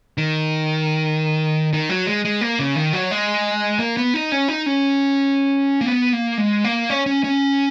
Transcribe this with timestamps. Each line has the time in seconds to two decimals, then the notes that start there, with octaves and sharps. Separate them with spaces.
0.18 D#3
1.73 D#3
1.89 F#3
2.07 G#3
2.25 G#3
2.41 A#3
2.59 C#3
2.76 D#3
2.93 F#3
3.11 G#3
3.79 A#3
3.97 B3
4.14 D#4
4.32 C#4
4.48 D#4
4.66 C#4
5.81 A#3
5.86 B3
6.13 A#3
6.37 G#3
6.64 A#3
6.90 C#4
7.06 C#4
7.24 C#4